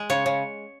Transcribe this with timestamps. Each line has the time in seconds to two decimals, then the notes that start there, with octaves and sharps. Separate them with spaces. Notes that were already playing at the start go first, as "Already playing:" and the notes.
Already playing: G#3
0.10 C#3 C#5
0.26 C#3